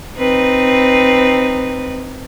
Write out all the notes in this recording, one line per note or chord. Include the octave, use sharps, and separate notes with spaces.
C4 D#4 B4